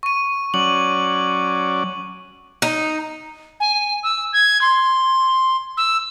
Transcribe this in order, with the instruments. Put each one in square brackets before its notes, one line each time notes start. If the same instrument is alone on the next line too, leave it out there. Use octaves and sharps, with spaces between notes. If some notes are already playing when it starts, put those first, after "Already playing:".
[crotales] C#6 D#7
[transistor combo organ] F#3 C#4 D5 [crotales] F#7
[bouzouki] D#4
[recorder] G#5
E6
G#6
C6
E6